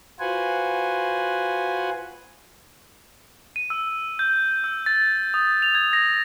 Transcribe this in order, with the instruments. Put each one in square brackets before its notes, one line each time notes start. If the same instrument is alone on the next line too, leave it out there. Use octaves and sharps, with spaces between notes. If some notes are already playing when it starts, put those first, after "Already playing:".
[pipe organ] F4 F#4 B4 C5 F#5 G#5
[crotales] D#7
E6
G6
E6
A6
D#6
F7
G#6
A#6